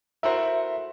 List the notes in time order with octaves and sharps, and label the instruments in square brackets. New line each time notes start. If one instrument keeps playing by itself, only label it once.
[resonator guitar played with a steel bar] A3 E4 F#4 [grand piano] A#4 C5 [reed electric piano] E5